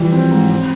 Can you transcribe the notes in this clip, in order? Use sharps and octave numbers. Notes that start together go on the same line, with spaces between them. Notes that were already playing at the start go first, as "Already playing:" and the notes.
Already playing: E3 F3 G3
C4
G#2
C4